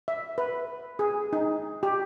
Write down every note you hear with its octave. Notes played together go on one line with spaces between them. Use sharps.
E5
B4
G#4
D#4
G4